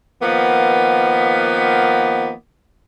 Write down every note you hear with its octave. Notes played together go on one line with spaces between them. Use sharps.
D#3 F3 A#3 B3